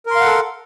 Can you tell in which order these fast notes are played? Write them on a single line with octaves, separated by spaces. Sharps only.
A#4 C6 F5 F#5 A4